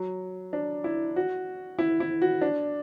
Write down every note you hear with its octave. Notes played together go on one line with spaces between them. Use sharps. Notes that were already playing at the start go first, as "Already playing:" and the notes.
Already playing: F#3
D4
E4
F#4
E4
E4
F#4
D4